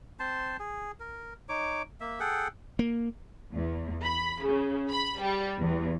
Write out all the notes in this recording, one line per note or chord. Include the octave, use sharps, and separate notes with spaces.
C4 C5 A5 C6
G#4
A#4
D#4 C#5 D6
A#3 E5
G#4 A4 F#5 G5
A#3
E2
B5
C#3
B5
G3
E2